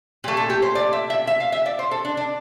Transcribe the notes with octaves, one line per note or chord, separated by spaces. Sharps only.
A#2 A3 G4
A4
G4
C5
D5
E5
E5
E5
F5
E5
D5
C5
A4
D4
D4